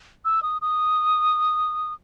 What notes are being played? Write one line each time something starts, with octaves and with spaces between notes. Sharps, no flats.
E6
D#6
D#6